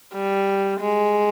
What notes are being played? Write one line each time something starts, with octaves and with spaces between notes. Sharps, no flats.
G3
G#3